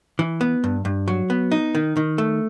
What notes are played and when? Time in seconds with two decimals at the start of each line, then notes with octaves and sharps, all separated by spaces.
0.19 E3
0.41 B3
0.64 G2
0.85 G2
1.08 F#3
1.30 B3
1.52 D#4
1.75 D#3
1.97 D#3
2.18 A3